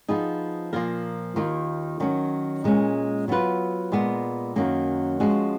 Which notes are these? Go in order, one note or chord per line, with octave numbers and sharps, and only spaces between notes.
F3 B3 D#4 G#4
A#2 F3 A#3 F4 A#4
D#2 D#3 A#3 F4
D#3 F#3 C#4
A#2 G#3 C#4
F#3 B3 F4 B4
A#2 G#3 B3
F#2 D#3 F#3 A#3 C#4
F3 G#3 C#4 F#4